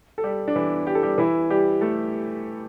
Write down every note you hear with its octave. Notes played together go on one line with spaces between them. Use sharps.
A4
G3 G4
D4
E3 E4
G4
A4
G3 G4
E3 E4
G3 G4
A3 A4